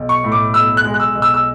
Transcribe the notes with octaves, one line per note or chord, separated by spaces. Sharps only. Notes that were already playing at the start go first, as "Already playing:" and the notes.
Already playing: B1
C#6
A2
D6
B1 E6
F#6
G#3
F#6
E6
B1
E6
E6